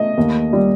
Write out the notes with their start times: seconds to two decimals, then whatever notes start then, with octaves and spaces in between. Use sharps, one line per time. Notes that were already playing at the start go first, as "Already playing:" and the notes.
Already playing: A3 D#5
0.17 D#2
0.53 G3